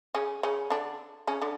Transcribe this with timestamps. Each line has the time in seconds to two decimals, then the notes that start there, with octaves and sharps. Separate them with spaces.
0.15 C#3 C#4
0.43 C#3 C#4
0.70 D3 D4
1.27 C#3 C#4
1.42 D3 D4